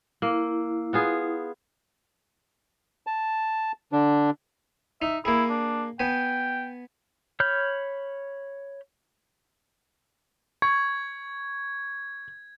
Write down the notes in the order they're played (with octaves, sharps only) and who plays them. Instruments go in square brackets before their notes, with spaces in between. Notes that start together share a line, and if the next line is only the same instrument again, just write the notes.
[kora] A#3 [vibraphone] E4
[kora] B3 F4 G#4
[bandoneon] A5
D3 D4
[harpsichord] D#4 [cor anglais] E5
[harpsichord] A#3 G#4 [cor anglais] E4
[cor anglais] D4
[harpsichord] B3 G#5 [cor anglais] G5
[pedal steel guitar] C#5 B5 F6 G6
[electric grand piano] C#6 [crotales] G#6